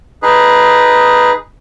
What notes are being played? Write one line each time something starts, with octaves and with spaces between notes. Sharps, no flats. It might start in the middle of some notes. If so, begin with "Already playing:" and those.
D#4 G#4 B4